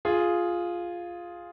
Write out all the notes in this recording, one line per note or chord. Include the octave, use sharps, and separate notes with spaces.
F4 G#4